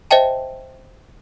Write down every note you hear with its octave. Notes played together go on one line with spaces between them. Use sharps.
C5 D#5 E5 G5 A5